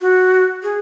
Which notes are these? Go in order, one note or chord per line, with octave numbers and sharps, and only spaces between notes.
F#4
G#4